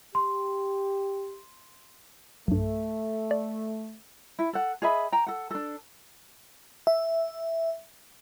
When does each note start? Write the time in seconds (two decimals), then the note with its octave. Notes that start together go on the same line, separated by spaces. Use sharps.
0.15 G4 C6
2.48 B1 G2 A3
3.31 D5
4.39 E4
4.53 A4 F#5
4.82 G#4 D#5 E5 B5
5.12 G5 A#5
5.27 A4 F#5
5.51 D4 A4
6.87 E5